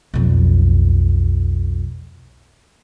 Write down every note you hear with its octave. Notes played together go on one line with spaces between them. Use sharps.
B1 F2